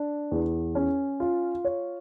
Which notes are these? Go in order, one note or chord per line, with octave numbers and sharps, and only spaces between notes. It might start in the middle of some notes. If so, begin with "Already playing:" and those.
Already playing: D4
E2
C#4
F4
C#5